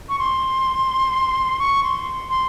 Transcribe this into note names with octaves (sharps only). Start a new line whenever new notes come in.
C#6
C6
C#6
C6
C6